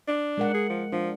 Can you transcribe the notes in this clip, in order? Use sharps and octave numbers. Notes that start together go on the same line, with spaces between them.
D4
G#3 A#4 F#5
G#4
F3
F3 D4